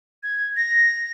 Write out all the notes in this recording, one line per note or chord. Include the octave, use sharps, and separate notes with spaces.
G#6
A#6